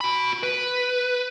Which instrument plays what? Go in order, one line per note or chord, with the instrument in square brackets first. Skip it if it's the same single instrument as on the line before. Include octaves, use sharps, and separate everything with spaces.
[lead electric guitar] F#4 B5
B4